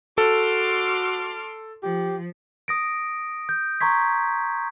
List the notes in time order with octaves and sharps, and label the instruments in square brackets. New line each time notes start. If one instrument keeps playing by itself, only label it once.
[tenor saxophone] F#4 [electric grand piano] A4 [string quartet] C6 D6 F6
[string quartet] F3 [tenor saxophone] G4
[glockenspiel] D#6 A#6 D7
G6
A#5 C6 C#6 G#6 B6